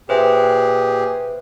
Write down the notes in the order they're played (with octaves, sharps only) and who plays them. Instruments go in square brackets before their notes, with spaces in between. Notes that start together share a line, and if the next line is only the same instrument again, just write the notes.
[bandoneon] A#2 G4 G#4 [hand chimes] B4 C5 E5